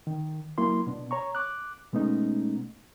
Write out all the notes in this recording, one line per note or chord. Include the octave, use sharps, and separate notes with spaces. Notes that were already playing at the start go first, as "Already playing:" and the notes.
D#3
F#3 A#3 E4 C6
B2 B3 D4
C#5 A#5 C#6
D6 F#6
B2 G#3 A3 B3 C#4 D#4